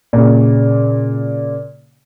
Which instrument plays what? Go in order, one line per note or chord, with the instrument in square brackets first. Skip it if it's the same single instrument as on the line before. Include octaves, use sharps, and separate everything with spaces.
[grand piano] A#2 C#3